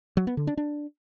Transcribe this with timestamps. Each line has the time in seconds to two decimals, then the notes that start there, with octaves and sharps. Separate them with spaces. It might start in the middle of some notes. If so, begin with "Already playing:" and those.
0.17 F#3
0.27 B3
0.37 D3
0.47 D4
0.57 D4